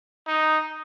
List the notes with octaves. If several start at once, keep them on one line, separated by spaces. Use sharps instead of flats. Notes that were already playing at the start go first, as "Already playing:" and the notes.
D#4